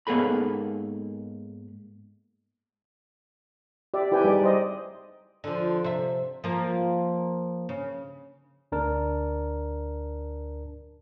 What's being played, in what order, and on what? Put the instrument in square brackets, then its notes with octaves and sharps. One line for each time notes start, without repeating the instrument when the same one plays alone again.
[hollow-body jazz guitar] G#2 A#3 B3 G#4 A4 B5
[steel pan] G4 D5 E5
E4 G4 B4 G5 G#5
G3 D#4 G#4 D5
C5 D#5
[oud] D3 F3
C3 E5
F3 A#3
C#3
[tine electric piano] D2 D4 A#4 A5